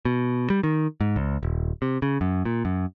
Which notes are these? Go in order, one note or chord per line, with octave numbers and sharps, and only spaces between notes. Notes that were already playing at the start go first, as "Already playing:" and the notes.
B2
G3
D#3
G#2
C#2
D#1
C3
C#3
F#2
A#2
F#2